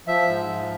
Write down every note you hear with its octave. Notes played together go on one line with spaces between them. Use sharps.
F3 E5
G#2
F3